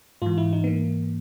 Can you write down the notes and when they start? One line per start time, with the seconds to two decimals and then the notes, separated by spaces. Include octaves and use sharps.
0.22 G#2 E3 F4
0.38 E4
0.53 D#4
0.64 B3
0.67 A#3